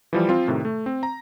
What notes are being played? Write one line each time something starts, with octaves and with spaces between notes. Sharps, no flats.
E3 F3 G3
F3 C4 F4
A2 C3 D#3
A3
C4
A#5